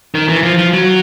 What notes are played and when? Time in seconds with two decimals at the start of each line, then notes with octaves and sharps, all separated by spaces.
0.15 D#3
0.29 E3
0.43 F3
0.58 F3
0.74 F#3